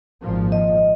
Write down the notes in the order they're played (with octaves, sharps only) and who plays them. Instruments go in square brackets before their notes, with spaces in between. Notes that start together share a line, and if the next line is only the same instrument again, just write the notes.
[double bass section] G#1 A#2 F3
[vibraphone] D#5